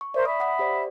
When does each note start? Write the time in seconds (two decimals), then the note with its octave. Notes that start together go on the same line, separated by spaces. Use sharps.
0.01 C#6
0.14 A#4 C5 D5 E5
0.25 E5 B5 D#6
0.40 F#5 D#6 B6
0.59 G4 C5 D5